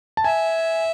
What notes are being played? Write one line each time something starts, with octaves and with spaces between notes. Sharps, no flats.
A5
E5 G#5